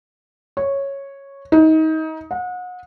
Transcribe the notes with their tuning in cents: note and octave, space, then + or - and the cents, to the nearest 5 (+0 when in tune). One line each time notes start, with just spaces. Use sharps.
C#5 -5
D#4 +25
F#5 -35